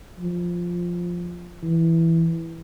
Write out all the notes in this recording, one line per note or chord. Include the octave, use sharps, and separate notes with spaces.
F3
E3